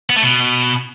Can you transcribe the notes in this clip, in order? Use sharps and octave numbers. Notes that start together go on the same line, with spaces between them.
B3
A3
B2